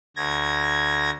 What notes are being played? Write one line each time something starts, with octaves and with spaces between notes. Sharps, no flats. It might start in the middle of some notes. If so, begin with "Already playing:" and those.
D2 G#6 A#6